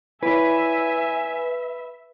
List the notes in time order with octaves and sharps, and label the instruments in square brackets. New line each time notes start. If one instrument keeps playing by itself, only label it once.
[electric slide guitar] E4 C#5 D5 [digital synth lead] B4 [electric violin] E5 [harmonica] G#5